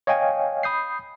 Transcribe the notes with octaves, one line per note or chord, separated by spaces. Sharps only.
C#5 D#5 F5 G5 G#5
B5 D#6 G6 C7